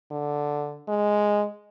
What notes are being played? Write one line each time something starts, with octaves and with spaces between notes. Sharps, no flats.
D3
G#3